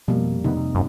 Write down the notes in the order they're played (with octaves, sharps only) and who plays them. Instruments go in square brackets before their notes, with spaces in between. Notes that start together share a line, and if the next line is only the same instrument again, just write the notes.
[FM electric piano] F2 [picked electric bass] B2 [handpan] G3 A#3
[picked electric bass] C3 D#3 B3 [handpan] D#4
[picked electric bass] C3
[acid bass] F#2